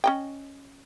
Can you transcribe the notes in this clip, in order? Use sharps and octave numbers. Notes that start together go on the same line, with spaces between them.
C#4 D#5 G5